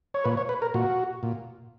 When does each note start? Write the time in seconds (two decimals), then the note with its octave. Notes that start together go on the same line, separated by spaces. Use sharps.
0.14 C#5
0.24 A#2 B4
0.37 C#5
0.49 B4
0.62 A#4
0.74 A#2 F#4
1.23 A#2